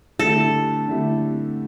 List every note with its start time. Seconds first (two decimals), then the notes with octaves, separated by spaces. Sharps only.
0.19 D3 A3 E4 G4 A4
0.88 D3 A3 E4 G4